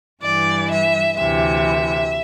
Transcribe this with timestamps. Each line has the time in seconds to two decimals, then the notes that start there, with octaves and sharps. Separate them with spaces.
0.22 G2 E3 D5
0.70 E5
1.17 D2 C3 E3 E5